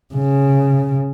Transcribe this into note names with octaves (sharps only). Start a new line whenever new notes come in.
C#3